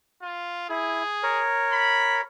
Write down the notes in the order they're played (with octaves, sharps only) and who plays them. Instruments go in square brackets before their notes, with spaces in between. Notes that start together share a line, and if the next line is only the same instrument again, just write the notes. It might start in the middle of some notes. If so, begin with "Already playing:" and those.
[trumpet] F4
[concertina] E4 [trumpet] G#4
[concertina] A#4 C#5
[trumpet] B5